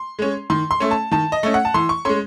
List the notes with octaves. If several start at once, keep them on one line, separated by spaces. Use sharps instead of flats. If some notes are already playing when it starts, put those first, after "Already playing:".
Already playing: C6
G#3 C#4
D#3 C6
C6
A3 C#4
A5
D#3 A5
D#5
A3 C#4
F#5
A5
E3 C6
C#6
G#3 C#4 C6